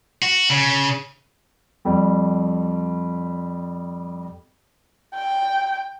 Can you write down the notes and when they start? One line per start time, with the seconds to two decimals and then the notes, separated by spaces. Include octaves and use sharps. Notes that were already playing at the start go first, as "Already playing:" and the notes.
0.22 F#4
0.50 C#3
1.85 F2 G3
5.15 G5